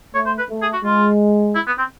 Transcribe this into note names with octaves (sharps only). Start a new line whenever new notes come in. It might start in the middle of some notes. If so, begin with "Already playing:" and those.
A3 C#5
C5
B4
A3
G#4
F#4
G#3 F4
E4
B3
C4